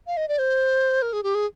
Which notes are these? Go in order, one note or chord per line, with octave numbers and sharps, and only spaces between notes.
F5
D#5
D5
C5
A#4
G#4
G4
G#4